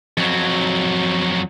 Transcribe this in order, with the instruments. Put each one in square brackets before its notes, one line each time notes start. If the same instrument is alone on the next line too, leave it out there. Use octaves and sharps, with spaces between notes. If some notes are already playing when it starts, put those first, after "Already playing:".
[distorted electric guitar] F2 F#3